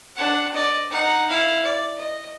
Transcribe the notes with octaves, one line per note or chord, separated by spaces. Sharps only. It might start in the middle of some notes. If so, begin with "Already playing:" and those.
D4 F#5
D5 D#5
D#4 F#5
E4 F5
D5
D#5